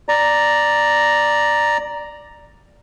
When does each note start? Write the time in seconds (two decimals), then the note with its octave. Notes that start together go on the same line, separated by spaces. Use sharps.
0.09 D5 A#5